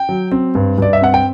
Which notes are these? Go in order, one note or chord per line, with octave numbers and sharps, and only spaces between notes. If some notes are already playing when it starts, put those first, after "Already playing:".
Already playing: G5
F#3
C4
G2
G2 D5
E5
C4 F#5
G5